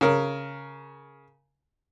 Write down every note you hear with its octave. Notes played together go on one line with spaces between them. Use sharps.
C#3 A#4